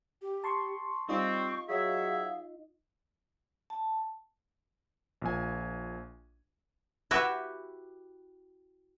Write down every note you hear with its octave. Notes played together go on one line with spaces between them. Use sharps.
G4
A5 C6 C#6
G3 C4 D#4 F4 D#5 C#6
F#3 G#4 E5 F5
A5
A#1 A#2 G#5
E4 F#4 G4 B4 E5